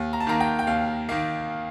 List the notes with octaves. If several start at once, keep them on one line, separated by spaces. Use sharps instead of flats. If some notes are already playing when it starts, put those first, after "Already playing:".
Already playing: D#2
A#5
A5
D#3 A#3 A#5
G5
G5
D#2 F5
D#3 A#3